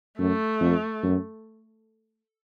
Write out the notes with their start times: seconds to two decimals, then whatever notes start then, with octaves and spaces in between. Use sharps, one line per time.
0.18 F#2 A3
0.61 F2
1.03 F#2